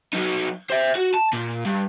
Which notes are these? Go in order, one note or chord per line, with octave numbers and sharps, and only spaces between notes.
F#3 D#4
C5 E5
F#4
A5
A#2
G2